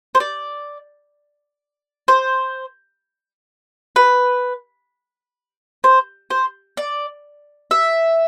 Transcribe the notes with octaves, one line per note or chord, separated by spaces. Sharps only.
C5
D5
C5
B4
C5
C5
D5
E5